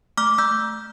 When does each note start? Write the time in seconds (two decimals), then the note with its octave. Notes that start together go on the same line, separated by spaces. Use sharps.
0.18 A3 D6 F6
0.38 A3 E6 G6